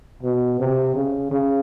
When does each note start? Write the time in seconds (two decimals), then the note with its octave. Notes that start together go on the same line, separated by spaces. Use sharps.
0.23 B2
0.60 C3
0.95 C#3
1.32 C#3